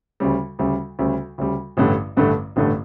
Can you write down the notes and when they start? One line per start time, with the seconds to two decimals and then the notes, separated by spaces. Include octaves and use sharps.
0.20 D2 C#3 G3
0.59 D2 C#3 G3
0.99 D2 C#3 G3
1.38 D2 C#3 G3
1.77 A1 G2 D3 A3
2.17 A1 G2 D3 A3
2.56 A1 G2 D3 A3